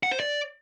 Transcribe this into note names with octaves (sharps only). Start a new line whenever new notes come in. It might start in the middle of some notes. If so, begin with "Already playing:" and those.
F#5
C5
D5